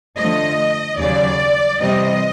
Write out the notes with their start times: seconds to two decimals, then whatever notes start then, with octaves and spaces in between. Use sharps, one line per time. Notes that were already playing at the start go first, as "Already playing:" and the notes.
0.17 D3 F3 A3 D#5
0.98 D#2 C#3 F#3 D5
1.80 C3 E3 G3 C4 D#5